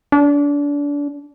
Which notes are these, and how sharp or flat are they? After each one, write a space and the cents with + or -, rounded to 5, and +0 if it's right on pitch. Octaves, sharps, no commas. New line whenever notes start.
D4 -30